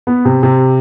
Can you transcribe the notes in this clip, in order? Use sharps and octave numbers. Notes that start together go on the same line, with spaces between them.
B3
C3
C3